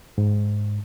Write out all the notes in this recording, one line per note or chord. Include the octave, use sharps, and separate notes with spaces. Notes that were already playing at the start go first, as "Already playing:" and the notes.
G#2